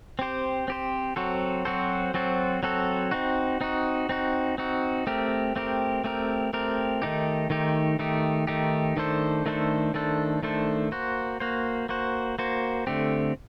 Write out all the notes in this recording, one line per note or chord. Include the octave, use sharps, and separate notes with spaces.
C4 G4 C5
C4 G4 C5
F#3 C4 F#4 A4 C5
F#3 C4 F#4 A4 C5
F#3 C4 F#4 A4 C5
F#3 C4 F#4 A4 C5
C4 D#4 F#4
C4 D#4 F#4
C4 D#4 F#4
C4 D#4 F#4
A3 C4 G4 A#4
A3 C4 G4 A#4
A3 C4 G4 A#4
A3 C4 G4 A#4
D#3 A3 D#4 G4
D#3 A3 D#4 G4
D#3 A3 D#4 G4
D#3 A3 D#4 G4
D#3 A3 D4 A4 C5
D#3 A3 D4 A4 C5
D#3 A3 D4 A4 C5
D#3 A3 D4 A4 C5
A#3 F#4 C5
A#3 F#4 C5
A#3 F#4 C5
A#3 F#4 C5
D3 A3 C4 G4